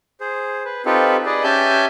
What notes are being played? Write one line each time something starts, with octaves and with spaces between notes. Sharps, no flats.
G#4 C5
B4
C4 D#4 F4 G4 A4 B4
G#4 B4 D5 D#5
C#4 G4 E5 G#5 A5 G6